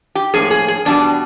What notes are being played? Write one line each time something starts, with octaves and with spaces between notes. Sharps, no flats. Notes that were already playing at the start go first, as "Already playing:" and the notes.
G4
A2 F3 A#3 C#4 G#4
G#4
G#4
E2 B2 G3 D4